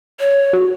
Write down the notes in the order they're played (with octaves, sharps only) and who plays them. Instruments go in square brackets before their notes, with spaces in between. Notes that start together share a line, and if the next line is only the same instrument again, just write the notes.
[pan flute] C#5
[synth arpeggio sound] F#4